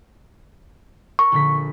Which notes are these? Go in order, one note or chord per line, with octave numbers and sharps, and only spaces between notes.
A#4 C#6
A#1 D3 B6